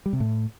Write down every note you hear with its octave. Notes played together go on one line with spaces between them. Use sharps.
G3
C3
A2